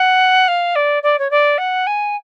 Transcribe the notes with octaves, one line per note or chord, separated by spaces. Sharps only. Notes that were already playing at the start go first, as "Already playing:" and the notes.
Already playing: F#5
F5
D5
D5
C#5
D5
F#5
G#5